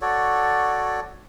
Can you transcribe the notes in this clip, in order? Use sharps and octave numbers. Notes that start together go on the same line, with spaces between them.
F#4 A4 C#5 D5